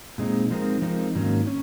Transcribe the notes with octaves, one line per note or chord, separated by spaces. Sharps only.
A#2 G#3 C4 D#4
F3 G#3 C4 D#4 A#4
F3 G#3 C4 D#4 A#4
G#2 D#3 F#3 A#3 C#4
C#4